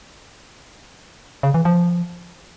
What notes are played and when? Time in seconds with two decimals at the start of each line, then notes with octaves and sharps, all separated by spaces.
1.43 C#3
1.54 E3
1.65 F3